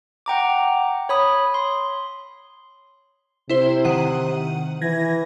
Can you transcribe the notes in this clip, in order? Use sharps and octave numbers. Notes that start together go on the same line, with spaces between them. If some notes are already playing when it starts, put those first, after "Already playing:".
F#5 G5 A#5 D6
C#5 B5 D#6
C6
C3 E4 C5
D#3 F#5 D#7
E3 G#6 A#6